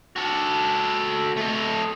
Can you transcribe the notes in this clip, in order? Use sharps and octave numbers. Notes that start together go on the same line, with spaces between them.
F#4 A4
A3 D#5